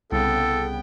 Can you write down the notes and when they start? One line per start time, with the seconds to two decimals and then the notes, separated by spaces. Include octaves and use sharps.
0.12 C2 C#3 B3 A4 G5